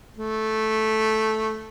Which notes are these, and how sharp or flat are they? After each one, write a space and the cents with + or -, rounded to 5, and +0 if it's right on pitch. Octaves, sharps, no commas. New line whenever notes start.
A3 -10